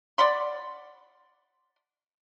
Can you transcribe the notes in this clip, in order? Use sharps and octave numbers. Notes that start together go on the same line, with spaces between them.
D5 F#5 B5 C6